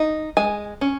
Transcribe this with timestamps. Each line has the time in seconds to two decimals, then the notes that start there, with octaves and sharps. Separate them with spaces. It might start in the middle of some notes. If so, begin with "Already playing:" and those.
Already playing: D#4
0.37 G#3 G#5
0.81 C#4